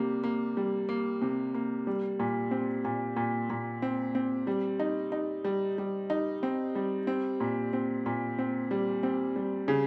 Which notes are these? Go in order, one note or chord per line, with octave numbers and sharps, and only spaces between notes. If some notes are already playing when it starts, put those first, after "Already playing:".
Already playing: C3 G3 A#3
A#3
G3
A#3
C3
A#3
G3
A#2
C4
A#2
A#2
A#2
C4
C4
G3
D#4
D#4
G3
G3
D#4
C4
G3
C4
A#2
C4
A#2
C4
G3
C4
G3
C#3